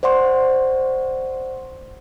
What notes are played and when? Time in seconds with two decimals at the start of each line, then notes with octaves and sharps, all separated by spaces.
0.03 C5 D5 F#5 C6 C#6